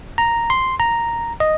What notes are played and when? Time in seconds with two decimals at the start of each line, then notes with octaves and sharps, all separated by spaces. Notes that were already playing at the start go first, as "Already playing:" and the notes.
0.18 A#5
0.50 C6
0.80 A#5
1.40 D#5